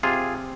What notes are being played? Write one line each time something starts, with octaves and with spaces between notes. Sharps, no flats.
C3 F4 G#4